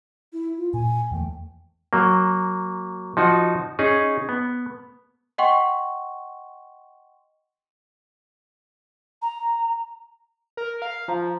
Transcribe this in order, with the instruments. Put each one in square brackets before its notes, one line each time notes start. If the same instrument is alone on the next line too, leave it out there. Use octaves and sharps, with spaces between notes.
[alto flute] E4
F4
[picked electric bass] A#2 [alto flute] G#5
[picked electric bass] E2 E3 A3 [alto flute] G5
[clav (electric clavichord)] F#3 A#3
F3 D#4 F#4
C#4 D#4 G#4
B3
[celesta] D#5 F#5 G5 C6 C#6
[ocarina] A#5
[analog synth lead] A#4
F5
[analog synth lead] F3 [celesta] F5 A#5